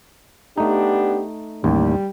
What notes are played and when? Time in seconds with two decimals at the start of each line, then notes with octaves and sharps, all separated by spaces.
0.58 A3 B3 D4 D#4 G4
1.64 A1 D#2 G3